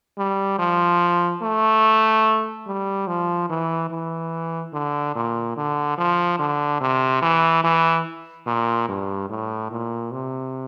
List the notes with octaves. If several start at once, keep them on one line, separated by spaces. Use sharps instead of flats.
G3
F3
A3
G3
F3
E3
E3
D3
A#2
D3
F3
D3
C3
E3
E3
A#2
G2
A2
A#2
C3